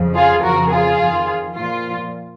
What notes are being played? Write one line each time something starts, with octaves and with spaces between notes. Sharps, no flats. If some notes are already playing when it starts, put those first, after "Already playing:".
Already playing: F2 C#3 F3
F4 G#4
F2 C#3 F3 F#4 A#4
F4 G#4
F2 D#3
A#2 F3 F4